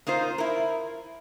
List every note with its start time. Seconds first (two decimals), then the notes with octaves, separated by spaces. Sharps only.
0.07 A#3 D#4 F4 C5
0.38 E4 A#4